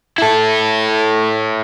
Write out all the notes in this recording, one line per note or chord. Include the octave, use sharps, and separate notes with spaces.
E4 A4